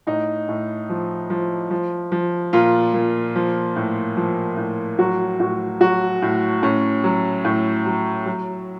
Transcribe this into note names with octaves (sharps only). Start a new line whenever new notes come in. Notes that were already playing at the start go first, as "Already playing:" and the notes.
A2 D#4
A2
F3
F3
F3
F3
A#2 F4
A#2
F3
A2
F3
A2
F#3 F#4
A2 F#4
F#3 F#4
A2
A2 C#4
F#3
A2
F#3
F#3